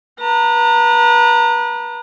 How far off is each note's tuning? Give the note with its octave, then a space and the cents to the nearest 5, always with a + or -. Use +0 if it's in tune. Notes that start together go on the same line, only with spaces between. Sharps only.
B4 -35 A#5 -30